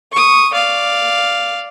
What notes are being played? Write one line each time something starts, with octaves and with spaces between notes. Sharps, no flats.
C#6 D#6
D5 F5